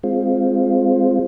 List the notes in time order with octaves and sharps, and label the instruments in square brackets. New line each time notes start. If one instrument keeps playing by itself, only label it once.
[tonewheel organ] G#3 C4 F4